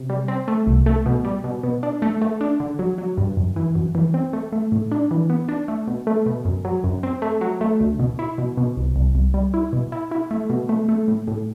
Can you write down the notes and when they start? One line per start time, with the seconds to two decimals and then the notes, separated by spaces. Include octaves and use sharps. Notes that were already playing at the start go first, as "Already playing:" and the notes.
Already playing: C3
0.10 G3
0.28 C4
0.48 A3
0.67 C2
0.86 A3
1.06 B2
1.25 G3
1.44 B2
1.63 B2
1.83 D4
2.02 A3
2.22 A3
2.41 D4
2.60 D3
2.79 F#3
2.98 F#3
3.17 G2
3.37 F#2
3.56 E3
3.75 F#2
3.95 E3
4.14 C4
4.33 A3
4.52 A3
4.72 A2
4.92 D4
5.11 E3
5.30 B3
5.49 D4
5.68 A3
5.88 B2
6.07 A3
6.26 B2
6.45 F#2
6.65 F#3
6.84 F#2
7.03 C4
7.22 A3
7.41 F#3
7.61 A3
7.80 D2
7.99 B2
8.19 E4
8.38 B2
8.57 B2
8.77 C2
8.96 C2
9.15 C2
9.34 G3
9.54 E4
9.73 B2
9.92 E4
10.11 E4
10.31 A3
10.50 B2
10.69 A3
10.89 A3
11.08 A2
11.27 A2